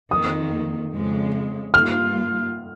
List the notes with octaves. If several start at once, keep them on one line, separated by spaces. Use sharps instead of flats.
F2 D#3 A#3 D#6
F2 C#3 G#3
G2 G3 A#3 F4 F6